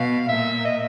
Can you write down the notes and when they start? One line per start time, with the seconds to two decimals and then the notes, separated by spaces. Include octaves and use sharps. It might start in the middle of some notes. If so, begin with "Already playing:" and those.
Already playing: B2 F5
0.29 A#2 E5
0.65 D#5